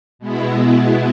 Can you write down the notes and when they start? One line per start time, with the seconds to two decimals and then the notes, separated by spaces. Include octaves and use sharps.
0.19 B2 G#3 B3 E4